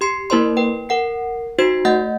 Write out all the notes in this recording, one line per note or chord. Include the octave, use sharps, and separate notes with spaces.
G4 C6 C7 C#7
A#3 E4 A#4 C5 D5 C6
B4 G5
A#4 F#5 C7
D#4 F#4 C5 C6 G#6 C7
A3 D#5 F#5 G6 A6